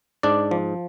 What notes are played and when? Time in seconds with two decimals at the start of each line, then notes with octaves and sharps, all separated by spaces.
0.23 G#2 D4 D5
0.51 F3